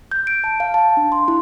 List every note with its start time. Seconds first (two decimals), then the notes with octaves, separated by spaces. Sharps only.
0.11 G6
0.27 D7
0.44 A5
0.60 F5
0.74 A5
0.97 D4
1.12 C6
1.28 E4